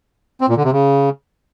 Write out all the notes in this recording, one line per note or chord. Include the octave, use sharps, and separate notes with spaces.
C4
A#2
D3
C3
C#3